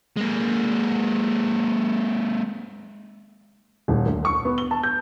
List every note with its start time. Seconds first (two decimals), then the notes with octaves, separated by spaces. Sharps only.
0.17 G#3 A#3
3.88 D#1
4.06 D2
4.25 C#6
4.45 B3
4.58 G7
4.71 A5
4.83 G6